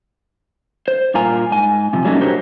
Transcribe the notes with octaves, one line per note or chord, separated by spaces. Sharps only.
C5
G2 A#2 F4 A#4 G#5
G#2 G#5
G2 C3 F3
F#3 G3 A3 A#3 C#4 D#4
D4 F#4 G4 A#4 C5 C#5